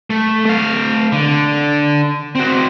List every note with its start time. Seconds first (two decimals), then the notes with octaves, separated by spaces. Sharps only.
0.10 A3
0.45 A3 F5
1.12 D3
2.35 C4 F#4